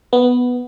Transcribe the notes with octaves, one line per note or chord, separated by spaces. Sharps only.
B3